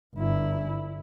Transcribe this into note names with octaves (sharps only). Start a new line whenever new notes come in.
G1 E4